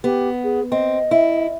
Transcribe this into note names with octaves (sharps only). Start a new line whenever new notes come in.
B3 G4
G#4
C4 D#5
E4